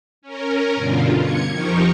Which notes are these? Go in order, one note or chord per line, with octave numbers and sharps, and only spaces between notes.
C#4 A#4
G2 B2 D3 F4
G#6 C#7
F2 F3 D#4 G4 A#4 C#6